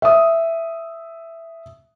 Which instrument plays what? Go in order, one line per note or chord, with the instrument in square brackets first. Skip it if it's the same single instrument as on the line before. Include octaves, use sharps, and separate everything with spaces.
[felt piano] E5 D#6